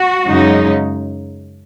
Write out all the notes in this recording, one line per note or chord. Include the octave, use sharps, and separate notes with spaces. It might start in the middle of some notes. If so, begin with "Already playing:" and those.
Already playing: F#4
F#2 C#3 G#3 D#4